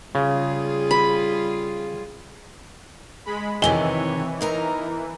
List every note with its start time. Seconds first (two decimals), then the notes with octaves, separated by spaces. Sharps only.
0.15 C#3 G3 F4 G#4
0.91 B5
3.26 G#3 B5
3.62 F2 C3 D#3 E3 C#5 D#5 G#5 G7
4.41 E2 D#4 A#4 A#5